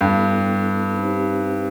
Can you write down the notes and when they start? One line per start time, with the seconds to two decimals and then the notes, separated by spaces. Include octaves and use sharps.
0.01 G2 B3 E4 A4
0.93 C4 D#4 G4 C5